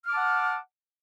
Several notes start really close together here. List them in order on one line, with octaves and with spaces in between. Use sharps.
F6 D6 A5 F#5